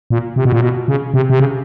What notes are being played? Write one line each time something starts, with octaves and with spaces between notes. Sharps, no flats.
A#2
C3
B2
A#2
B2
C#3
C3
C3
C#3